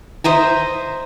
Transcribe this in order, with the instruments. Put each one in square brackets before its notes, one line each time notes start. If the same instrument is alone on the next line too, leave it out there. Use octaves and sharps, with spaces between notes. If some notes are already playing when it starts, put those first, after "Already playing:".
[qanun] C5 D#5 E5 A#5